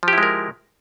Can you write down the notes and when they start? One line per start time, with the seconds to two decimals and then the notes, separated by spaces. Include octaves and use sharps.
0.03 F3
0.08 G4
0.13 E4
0.18 G#3
0.23 A#4